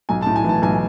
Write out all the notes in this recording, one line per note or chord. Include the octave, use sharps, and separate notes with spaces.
B1 G#5
A5
A2
G#5
E3 A5
B1 G#5